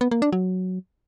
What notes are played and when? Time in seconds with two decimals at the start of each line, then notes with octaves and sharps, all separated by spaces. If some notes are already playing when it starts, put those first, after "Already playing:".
0.01 B3
0.11 A#3
0.22 D4
0.32 F#3